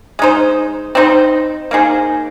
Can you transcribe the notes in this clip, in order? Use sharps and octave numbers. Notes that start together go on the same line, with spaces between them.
G#3 D#4 C5
C4 D#4 C5
A#3 D#4 G#4 C5